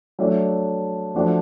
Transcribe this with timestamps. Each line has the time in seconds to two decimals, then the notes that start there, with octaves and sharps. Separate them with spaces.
0.19 F#3 A3 D4
1.15 F3 A3 D4 F#4